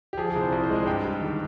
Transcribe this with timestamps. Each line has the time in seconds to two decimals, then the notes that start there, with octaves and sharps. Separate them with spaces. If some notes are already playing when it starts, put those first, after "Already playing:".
0.13 G4
0.18 F3 G#4
0.30 G#4
0.35 C2
0.41 C5
0.52 C2 G#4
0.63 C5
0.70 G#3
0.75 G#4
0.86 G2 G5
1.04 G3
1.21 D#3